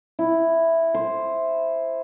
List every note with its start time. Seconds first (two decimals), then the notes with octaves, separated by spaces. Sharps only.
0.19 E4
0.94 C5